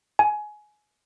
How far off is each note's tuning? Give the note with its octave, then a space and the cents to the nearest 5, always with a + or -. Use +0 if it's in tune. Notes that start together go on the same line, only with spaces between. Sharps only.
G#5 +20